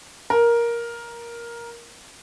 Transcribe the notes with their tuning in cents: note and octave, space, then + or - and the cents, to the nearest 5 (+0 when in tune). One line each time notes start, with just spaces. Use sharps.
A#4 +10